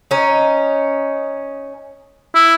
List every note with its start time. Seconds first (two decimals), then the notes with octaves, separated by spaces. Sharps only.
0.11 C#4 D#4
2.35 E4